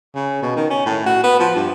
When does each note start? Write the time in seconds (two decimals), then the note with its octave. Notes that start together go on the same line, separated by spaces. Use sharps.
0.15 C#3
0.42 B2
0.57 D#3
0.70 C#4
0.86 A2
1.06 F#4
1.23 B3
1.40 F3
1.56 G2